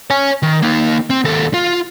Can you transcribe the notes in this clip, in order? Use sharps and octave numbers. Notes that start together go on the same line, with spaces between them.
C#5 G#5
D#3
A#3 D#4
C4
D#2 A4
F4